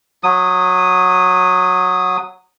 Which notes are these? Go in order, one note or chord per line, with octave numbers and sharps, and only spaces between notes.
F#3 D#6